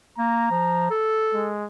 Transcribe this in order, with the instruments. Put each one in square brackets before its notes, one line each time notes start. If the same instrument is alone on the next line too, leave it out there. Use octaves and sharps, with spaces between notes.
[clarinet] A#3 [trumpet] A#5
[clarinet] F3
A4
[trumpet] G#3